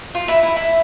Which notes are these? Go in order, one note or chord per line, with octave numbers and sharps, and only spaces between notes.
F4
E4
E4
E4